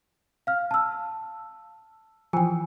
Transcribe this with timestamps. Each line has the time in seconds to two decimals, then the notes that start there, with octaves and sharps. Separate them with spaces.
0.47 F5 F6
0.71 A5 E6
2.33 E3 F3 G5 G#5